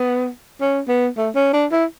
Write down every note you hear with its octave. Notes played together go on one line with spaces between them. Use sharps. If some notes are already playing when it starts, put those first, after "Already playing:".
Already playing: B3
C#4
B3
A3
C#4
D4
E4